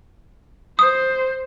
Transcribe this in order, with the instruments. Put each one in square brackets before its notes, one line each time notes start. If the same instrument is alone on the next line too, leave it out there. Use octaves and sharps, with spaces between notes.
[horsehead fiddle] C5 [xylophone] D#6